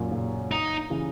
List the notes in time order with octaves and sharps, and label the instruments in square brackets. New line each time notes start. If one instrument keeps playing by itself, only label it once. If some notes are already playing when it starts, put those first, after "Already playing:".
Already playing: [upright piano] F#2 A#2
A#2 C#3
[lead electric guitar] D#4
[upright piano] C#3 E3